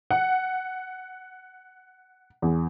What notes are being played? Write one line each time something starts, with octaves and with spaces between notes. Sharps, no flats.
F#5
E2